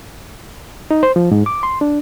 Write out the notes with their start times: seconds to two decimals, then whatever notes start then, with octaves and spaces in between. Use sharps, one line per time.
0.91 D#4
1.03 C5
1.16 F3
1.31 G#2
1.46 D6
1.63 C6
1.81 D4